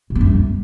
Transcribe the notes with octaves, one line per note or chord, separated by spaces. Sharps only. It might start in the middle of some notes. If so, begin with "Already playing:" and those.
A#2
B3
F#2
G3